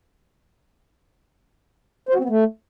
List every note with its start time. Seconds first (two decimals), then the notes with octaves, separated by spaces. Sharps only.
2.09 C5
2.14 F#4
2.19 C4
2.24 B3
2.29 A3